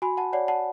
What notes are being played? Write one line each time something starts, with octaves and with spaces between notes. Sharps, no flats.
F#4 G#5 B5
F#5 A5
C#5 D5 F#5
F#5 A5